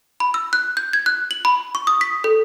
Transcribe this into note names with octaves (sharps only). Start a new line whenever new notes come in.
B5
E6
F#6
G6
G#6
F#6
F#7
B5
C#6
D#6
B6
A4